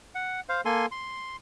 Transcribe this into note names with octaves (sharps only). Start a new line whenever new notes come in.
F#5
C5 F5
A#3 A4 G#5 C6
C6